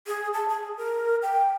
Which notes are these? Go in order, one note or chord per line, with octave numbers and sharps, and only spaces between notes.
G#4
A5
G#4
A#4
G5